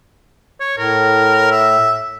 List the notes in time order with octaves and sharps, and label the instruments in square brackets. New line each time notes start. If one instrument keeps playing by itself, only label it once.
[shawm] C#5
[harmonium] A2 [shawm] A#4
[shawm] E5